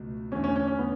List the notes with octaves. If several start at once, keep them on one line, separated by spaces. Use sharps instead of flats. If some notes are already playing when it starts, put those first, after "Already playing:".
Already playing: C#2 B2 F#3 A3
E2 D3 A3 C#4
C#4
C#4
C#4
B3